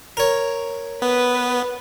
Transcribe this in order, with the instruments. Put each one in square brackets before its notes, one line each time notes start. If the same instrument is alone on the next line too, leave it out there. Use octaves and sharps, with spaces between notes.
[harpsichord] A#4 C#5
[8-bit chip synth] B3 [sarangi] B4